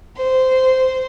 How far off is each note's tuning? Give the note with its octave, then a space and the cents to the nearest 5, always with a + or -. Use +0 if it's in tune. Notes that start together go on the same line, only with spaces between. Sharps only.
C5 -10